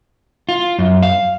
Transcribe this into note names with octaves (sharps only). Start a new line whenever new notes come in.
F4
F#2
F5